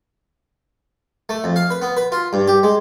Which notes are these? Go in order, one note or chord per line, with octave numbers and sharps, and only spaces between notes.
A3
F2
F5
B4
B3
B4
F4
G2
G4
G#3